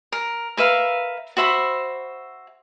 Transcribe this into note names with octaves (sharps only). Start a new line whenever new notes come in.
A#4
A#4 B4 E5 F5
F#4 C5 E5 B5